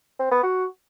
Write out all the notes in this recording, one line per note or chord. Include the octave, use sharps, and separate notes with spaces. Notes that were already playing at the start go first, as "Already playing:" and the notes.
C4
B3
F#4